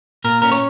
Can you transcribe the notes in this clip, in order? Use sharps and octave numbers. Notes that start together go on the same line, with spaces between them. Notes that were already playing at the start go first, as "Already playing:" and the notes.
A#2 A#4
C#4 A#4
C#5